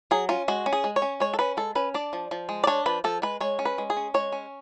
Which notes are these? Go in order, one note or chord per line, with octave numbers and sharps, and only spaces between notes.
F#3 G#4
C#4 F4
G#3 F#4
C#4
G#4
G#3
C#5
C#4
G#3 C#5
A4
C#4 B4
G#3 A4
C#4 B4
D4 D5
F3
F3
G#3
D5
D4 C#5
F3 B4
F3 A4
G#3 B4
G#3 C#5
C#4
B4
G#3
G#4
C#4
G#3 C#5
C#4